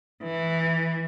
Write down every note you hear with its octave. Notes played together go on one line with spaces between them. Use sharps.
E3